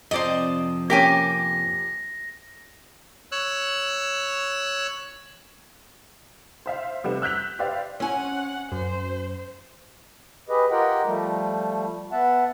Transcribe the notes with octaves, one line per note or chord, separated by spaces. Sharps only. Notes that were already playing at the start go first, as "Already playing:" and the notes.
F2 C3 F3 C5 D5 D#5
A#3 C#4 G4 G5 G#5 A#6
C#5 E6 F#6
C5 E5 F5
C3 G3 A3 B4 F#5 E7
E6 F#6 G6 B6 F7
G4 B4 C5 D5 E5 F5
C4 C#4 F#5 G#5
F#2 C5
G4 G#4 B4 D#5
F4 G4 A#4 D#5 F#5 G5
F3 G3 A3
B3 E5 F#5 A5